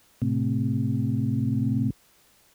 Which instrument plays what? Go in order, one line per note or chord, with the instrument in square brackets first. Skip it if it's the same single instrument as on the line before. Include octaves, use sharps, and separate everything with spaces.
[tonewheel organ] A2 C3